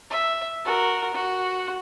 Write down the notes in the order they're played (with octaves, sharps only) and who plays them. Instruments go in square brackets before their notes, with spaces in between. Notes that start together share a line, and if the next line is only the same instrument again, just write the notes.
[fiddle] E5
F#4 A#4
F#4